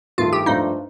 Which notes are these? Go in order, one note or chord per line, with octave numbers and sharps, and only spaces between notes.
G2 D#3 A3 F4
G4
G2 F3 A3 D4 D#4 F4